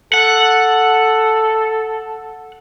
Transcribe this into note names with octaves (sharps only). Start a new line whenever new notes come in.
A4 F#5